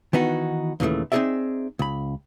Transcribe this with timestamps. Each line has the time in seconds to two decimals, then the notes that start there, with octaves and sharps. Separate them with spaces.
0.13 D#3 E3 B3 D#4 F#4
0.80 D#2 A#2 C#3 E3 A3
1.12 C4 D#4 F#4 G#4 D5 E5
1.79 C#2 B5